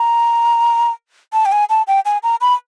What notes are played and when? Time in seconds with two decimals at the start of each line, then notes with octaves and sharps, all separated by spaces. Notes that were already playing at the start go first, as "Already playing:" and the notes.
Already playing: A#5
1.33 A5
1.45 G5
1.52 G#5
1.70 A5
1.87 G5
2.05 G#5
2.23 A#5
2.41 B5